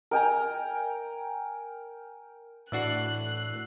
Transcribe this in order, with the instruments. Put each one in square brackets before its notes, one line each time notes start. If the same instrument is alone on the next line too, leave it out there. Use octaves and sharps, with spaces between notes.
[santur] A#4 G5 G#5 A#5
[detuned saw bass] A2 [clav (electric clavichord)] E3 D4 F#4 [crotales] E6 C7 F#7 [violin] F#6